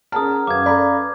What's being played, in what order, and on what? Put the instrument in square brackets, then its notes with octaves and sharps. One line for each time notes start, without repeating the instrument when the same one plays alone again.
[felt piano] C#4 G#4 A5 [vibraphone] A#4 F#5 A#5 [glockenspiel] D#6 F6
[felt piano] F#2 [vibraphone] C#4 B4 F5 [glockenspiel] D6 G#6
[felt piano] A4 B5 [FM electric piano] D5 A#5